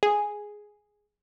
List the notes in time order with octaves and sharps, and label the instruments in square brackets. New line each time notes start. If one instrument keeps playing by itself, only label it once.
[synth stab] G#4